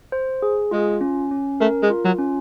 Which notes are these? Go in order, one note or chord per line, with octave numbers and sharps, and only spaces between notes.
C5
G#4
G#3 F4
C#4
C#4
A3 A#4
G#3
F4
F#3
C#4